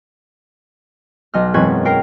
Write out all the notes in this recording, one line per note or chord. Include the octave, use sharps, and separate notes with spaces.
B1 D#5 F6
E1 F#2 C4 B4 C#6 G#6
A#4 G5 C7